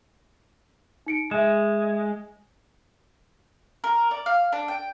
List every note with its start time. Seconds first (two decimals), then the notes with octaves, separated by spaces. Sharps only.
1.07 D#4 C#7 D7
1.31 G#3 E5 E7
3.84 A#4
4.11 D5
4.26 F5
4.52 D4
4.68 G5